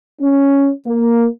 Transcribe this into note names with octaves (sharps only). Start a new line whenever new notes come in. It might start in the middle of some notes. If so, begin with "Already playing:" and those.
C#4
A#3